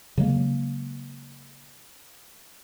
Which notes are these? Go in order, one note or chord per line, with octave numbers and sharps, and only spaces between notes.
C#3 F#3 G#3 A#3